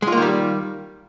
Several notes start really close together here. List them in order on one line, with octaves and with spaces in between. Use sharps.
G#3 F4 A#3 D#3 G3